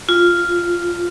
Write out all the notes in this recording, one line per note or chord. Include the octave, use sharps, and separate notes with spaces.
F4